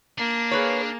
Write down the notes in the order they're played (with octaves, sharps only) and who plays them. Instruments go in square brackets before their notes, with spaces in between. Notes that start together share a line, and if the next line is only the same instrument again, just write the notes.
[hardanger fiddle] A#3 [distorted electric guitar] D4
[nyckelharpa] G#4 F5 [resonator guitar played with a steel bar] B4 C#5